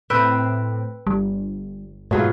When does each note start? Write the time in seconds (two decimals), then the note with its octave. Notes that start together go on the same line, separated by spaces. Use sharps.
0.10 A2 C4 B4 E5 G5
1.07 G1 G3
2.11 G#2 B2 F#3 A3 F4 G#4